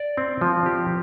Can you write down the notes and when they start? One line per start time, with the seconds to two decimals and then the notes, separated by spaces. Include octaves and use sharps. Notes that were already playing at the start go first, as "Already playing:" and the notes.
Already playing: D5
0.17 C4
0.41 F3
0.66 G4